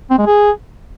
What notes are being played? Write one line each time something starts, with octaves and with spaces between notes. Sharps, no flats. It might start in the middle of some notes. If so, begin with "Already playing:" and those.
C4
G#3
G#4